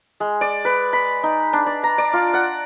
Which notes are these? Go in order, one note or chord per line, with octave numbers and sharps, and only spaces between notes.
G#3
D5
B4
B5
D#4
D4
D5
A#5
D5
F4
F#5